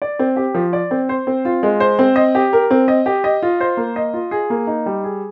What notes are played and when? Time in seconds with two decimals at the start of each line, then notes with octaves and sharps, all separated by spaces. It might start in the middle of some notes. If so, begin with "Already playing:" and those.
0.02 D5
0.19 C4
0.36 G4
0.54 F3
0.73 D5
0.91 C4
1.09 C5
1.27 C4
1.45 F4
1.63 G#3
1.80 C5
1.99 C4
2.16 D#5
2.35 G4
2.53 A#4
2.71 C4
2.88 D#5
3.06 G4
3.24 D#5
3.43 F4
3.60 C5
3.77 A#3
3.96 D#5
4.14 F4
4.31 G#4
4.50 A#3
4.67 D#4
4.86 G3
5.04 G#4